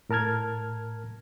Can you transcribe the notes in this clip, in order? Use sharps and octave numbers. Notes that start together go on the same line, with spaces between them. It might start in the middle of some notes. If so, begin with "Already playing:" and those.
A2 A#4 A5 F6 G#6